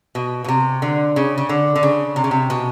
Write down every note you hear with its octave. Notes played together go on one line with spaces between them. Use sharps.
B2
B2
C3
D3
C#3
C#3
D3
D3
C#3
C3
C#3
C3
B2